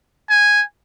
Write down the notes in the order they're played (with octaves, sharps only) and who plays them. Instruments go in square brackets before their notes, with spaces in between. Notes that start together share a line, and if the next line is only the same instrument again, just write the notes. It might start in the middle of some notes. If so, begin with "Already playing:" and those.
[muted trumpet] G#5